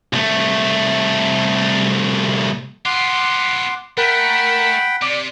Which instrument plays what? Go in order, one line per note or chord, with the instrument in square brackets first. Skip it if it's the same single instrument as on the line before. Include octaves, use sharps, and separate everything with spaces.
[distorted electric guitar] C2 A3
[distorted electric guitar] B3 F4 [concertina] F#5 C6 D6
[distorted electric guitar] A3 [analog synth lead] A#4 [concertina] F#5 G5 B5
[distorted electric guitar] C3 [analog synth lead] D5